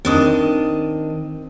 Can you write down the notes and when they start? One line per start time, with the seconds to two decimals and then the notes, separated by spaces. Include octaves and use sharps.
0.05 D#3 C4 D4 D#5 D#6